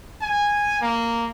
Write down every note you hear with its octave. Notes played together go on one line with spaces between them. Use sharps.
G#5
A#3